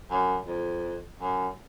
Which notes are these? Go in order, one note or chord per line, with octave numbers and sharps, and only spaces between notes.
F#2
F2
F#2